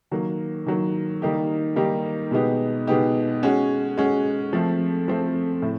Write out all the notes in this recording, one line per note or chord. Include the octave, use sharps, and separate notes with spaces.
D#3 F#3 A#3
D#3 F#3 A#3
D#3 G3 A#3 D#4 G4
D#3 G3 A#3 D#4 G4
B2 G#3 B3 D#4 G4
B2 G#3 B3 D#4 G4
G#3 C#4 F#4
G#3 C#4 F#4
F3 A3 C4
F3 A3 C4
A2